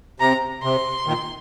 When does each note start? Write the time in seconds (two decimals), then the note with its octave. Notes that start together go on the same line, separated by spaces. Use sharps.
0.20 C3 A#5
0.63 C3 C6
1.07 A#2 D#3